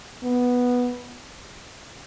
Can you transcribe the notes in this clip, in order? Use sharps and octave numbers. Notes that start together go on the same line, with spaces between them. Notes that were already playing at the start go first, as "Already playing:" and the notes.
B3